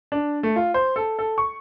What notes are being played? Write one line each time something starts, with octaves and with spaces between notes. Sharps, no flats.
D4
A3
F4
C5
A4
A4
C#6